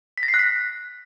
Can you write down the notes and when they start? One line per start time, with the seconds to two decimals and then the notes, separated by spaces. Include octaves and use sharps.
0.18 B6
0.23 A#6
0.28 C7
0.34 F#6
0.39 B6